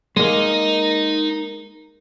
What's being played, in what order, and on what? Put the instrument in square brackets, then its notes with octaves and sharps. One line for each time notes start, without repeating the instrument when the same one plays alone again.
[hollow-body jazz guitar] G#3 A#3 [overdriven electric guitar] D#4